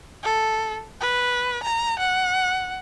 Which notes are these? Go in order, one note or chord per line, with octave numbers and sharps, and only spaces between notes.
A4
B4
A#5
F#5